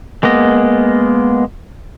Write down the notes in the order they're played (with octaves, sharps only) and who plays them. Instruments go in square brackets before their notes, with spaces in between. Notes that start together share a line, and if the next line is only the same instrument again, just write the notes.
[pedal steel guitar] G#3 A#3 B3 D#5